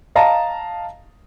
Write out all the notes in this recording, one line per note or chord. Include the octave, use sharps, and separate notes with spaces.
D#5 F5 A5 A#5